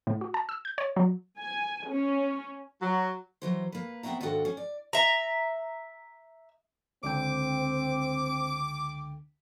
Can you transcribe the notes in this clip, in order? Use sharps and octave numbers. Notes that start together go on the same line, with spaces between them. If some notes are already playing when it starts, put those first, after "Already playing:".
A2
F#4
A5
E6
G6
C#5
F#3
G#5
C#4
F#3
E3 F#3 C5
A#3 B4
B3 C4 E4 F#4 E5 A#5
D#2 G#2 D4 F#4 A4
C#4
D5
E5 A#5
C#2 D3 C4 G5 D6